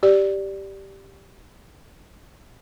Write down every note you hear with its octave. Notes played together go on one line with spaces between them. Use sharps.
G4 D5